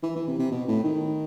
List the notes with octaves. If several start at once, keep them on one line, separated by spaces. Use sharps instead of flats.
E3
E3
C3
C3
B2
A2
D#3